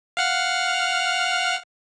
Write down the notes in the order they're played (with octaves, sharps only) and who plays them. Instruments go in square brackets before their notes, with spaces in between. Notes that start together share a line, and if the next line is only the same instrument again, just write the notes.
[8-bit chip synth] F5 F#5 F6